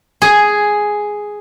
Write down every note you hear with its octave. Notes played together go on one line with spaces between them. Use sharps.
G#4